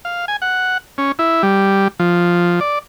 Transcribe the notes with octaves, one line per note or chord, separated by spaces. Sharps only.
F5
G#5
F#5
C#4
E4
G3
F3
D5